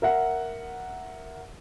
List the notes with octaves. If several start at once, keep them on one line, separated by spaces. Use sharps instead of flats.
A#4 E5 F#5